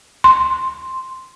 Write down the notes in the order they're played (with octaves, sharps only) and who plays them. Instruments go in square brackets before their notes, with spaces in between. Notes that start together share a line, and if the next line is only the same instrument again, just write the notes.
[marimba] C6